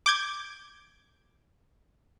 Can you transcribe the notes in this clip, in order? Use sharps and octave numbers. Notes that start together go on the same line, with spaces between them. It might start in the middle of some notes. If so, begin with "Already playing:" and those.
D6 G6 G#6